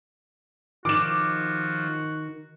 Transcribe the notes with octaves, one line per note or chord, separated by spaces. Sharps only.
D#3 F3 F#4 D6 E7